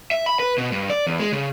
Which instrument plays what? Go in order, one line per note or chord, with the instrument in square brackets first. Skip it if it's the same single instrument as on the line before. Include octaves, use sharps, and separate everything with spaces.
[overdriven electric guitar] E5
B5
B4
B2
G2
D5
E2
G#3
C#3